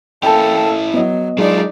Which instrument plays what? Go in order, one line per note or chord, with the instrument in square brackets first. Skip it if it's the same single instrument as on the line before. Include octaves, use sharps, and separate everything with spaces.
[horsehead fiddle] A#3 A4 [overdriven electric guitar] C#4 E4 [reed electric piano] G5 A5
[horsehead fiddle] F#3 [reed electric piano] B3 D#5
[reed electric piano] F#3 G#3 G#4 [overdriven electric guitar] D4 F4 [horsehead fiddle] D#4 D5